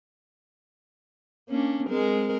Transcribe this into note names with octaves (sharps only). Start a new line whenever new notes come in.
A#3 C#4 D4
G#3 C4 A#4